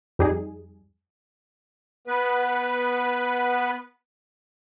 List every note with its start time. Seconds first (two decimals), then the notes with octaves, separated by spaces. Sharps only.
0.19 F2 G3 D#4 G#4
2.07 B3 B4